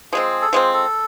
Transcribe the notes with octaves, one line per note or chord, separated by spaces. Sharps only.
F3 G#3 C4 G#4
A4
F3 G#3 C4 G#4
A4